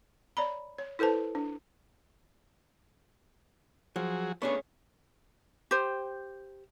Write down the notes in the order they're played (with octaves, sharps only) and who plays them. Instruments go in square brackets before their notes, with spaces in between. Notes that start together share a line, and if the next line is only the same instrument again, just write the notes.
[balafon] C#5 D5 A#5 B5
C#5
E4 A4 B4 C5 A5
D4
[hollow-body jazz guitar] F3 [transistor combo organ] F#3 F#4 G#4
[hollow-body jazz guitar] A3 C#4 G#4 [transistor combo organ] B3 D4 C#5
[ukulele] G4 C5